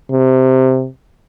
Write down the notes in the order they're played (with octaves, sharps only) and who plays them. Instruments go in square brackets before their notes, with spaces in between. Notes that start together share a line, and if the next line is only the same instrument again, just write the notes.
[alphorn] C3